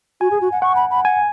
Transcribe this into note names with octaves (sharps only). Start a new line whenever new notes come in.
F#4 G#5
G#4
F#4
F#5
F#5 C#6
B5
B5
F#5 G#5